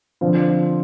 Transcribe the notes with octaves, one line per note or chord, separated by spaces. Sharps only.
D3 F3 C4 F4